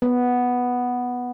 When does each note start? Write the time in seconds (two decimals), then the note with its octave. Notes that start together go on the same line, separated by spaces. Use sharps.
0.02 B3